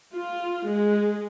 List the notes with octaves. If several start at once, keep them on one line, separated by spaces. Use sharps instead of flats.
F4
G#3